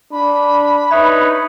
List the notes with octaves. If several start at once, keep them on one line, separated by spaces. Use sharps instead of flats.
D4 B5
D#4 B4 C#5 E5